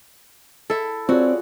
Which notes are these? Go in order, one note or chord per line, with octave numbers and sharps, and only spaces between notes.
E4 A4
C4 F4 F#4 G#4 C#5 D5